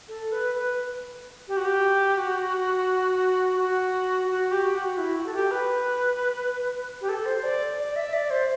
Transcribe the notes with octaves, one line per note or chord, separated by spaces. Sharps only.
A4
B4
B4
G4
F#4
G4
F#4
F#4
F#4
G4
F#4
E4
F#4
A4
G4
B4
G4
A4
C5
D5
D5
E5
D5
C5